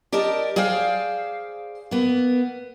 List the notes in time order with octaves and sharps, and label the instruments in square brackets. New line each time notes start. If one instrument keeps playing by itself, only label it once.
[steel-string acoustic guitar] G4 A#4 D5 D#5 A5
G#4 C5 D5 F5 G5
A#3 B3